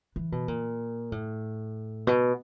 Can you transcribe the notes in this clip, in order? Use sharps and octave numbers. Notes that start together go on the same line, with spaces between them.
E3
B2
A#2
A2
B2